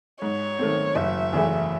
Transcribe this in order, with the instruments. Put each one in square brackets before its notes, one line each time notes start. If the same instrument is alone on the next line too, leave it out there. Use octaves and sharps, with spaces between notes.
[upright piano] G#2 [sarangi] C#5
[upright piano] D#3 A3 C4
[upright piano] F#1 [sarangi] E5
[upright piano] E2 C#3 E3 A3